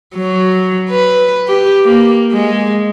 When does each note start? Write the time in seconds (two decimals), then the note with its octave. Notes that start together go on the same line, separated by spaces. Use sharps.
0.15 F#3
0.89 B4
1.48 G4
1.85 A#3
2.32 G#3